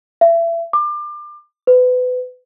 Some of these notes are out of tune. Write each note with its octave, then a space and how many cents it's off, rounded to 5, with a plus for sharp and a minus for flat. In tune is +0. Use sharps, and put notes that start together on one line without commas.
E5 +30
D6 +30
B4 +30